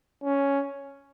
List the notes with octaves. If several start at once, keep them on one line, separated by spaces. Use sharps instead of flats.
C#4